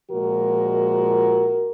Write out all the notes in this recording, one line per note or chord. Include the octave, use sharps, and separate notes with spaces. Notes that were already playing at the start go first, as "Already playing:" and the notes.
A#2 F3 G#3 F#4 A#4